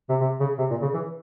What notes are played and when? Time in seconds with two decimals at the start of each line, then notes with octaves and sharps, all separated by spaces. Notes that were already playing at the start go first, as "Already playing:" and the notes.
0.09 C3
0.21 C3
0.40 C#3
0.58 C3
0.70 A#2
0.82 C#3
0.94 E3